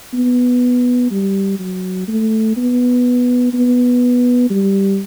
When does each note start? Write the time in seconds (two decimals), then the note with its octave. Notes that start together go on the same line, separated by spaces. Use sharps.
0.14 B3
1.11 G3
1.60 F#3
2.08 A3
2.57 B3
3.54 B3
4.50 G3